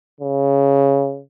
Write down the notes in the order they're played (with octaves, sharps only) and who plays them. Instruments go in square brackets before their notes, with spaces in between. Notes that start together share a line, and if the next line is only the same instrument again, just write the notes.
[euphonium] C#3